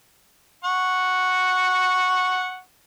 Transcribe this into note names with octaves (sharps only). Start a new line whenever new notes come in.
F#5 C#6